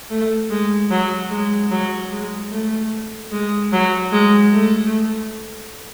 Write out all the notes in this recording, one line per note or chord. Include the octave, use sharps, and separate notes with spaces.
A3
G#3
F#3
G#3
F#3
G#3
A3
G#3
F#3
G#3
A3